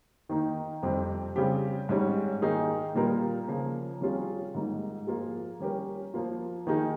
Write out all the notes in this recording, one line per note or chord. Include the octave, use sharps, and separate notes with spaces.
D#3 A#3 D#4
F2 C3 G3 C4
C#3 G3 C4 G4
G#2 G3 C#4
D#3 A#3 D#4 G#4
A#2 G3 A#3 F4 A#4
C#3 F3 A#3
C3 G3 C#4 F4 G#4
G#2 G3 A#3 D#4
F3 A#3 F4 G#4
G3 C#4 G4 A#4
F3 A#3 F4
D#3 A#3 D#4 G#4